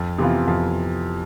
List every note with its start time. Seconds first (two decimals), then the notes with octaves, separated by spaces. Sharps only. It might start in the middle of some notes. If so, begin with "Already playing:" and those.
Already playing: F2
0.18 C3 E3 B3 F4
0.47 F2